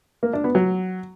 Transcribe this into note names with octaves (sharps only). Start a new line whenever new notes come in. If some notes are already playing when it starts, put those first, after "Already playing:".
A#3
D4
B3
F#3